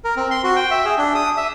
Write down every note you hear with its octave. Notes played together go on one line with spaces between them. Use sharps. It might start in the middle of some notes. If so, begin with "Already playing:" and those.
A#4
C4
C6
F#4
G5
E5
G#4
D4
D#6
E5